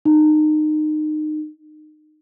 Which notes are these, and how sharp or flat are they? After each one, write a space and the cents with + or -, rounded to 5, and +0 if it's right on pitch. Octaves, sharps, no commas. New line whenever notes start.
D#4 -25